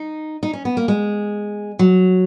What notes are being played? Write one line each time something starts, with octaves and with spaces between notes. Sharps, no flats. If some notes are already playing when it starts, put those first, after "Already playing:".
Already playing: D#4
D#4
C#4
B3
A#3
G#3
F#3